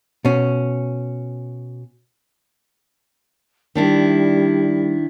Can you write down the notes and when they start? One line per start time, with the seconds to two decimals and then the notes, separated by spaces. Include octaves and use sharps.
0.25 B2 C#4
3.75 D#3 G3 D4 E4